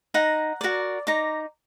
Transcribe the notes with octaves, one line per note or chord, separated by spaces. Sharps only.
D#4 F#5 A#5
F#4 A#4 D5
D#4 A#5 D6